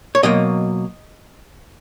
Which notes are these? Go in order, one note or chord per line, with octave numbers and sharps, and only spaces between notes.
C#5
B2 F#3 A#3 D#5